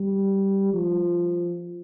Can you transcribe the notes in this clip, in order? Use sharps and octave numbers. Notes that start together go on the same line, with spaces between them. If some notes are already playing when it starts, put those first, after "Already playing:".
Already playing: G3
F3